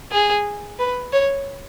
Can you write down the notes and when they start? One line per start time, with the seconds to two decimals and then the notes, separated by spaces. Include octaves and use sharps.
0.12 G#4
0.79 B4
1.13 C#5